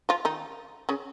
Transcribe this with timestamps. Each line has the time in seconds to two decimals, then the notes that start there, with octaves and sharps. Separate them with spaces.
0.09 F3 F4
0.25 D#3 D#4
0.89 C#3 C#4